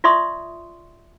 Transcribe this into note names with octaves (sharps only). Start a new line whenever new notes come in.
F4 D5 E5 C6 C#6 D#6